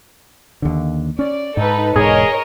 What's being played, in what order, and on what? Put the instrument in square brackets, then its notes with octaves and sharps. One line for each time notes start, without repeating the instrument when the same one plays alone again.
[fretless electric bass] D#2 D3
[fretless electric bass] C#4 [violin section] D5
[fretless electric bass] G#2 [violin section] D#4 A4 B4
[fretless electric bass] E1 G#2 [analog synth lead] G#4 [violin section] A#4 C#5 D#5